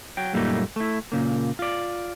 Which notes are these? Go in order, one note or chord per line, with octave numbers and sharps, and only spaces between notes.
F#3 G5
F#2 A#2 G3 A3 A#3 D#4
A3 E4
A#2 C#3 A#3
F4 D5